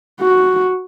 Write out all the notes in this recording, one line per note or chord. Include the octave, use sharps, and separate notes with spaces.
F#4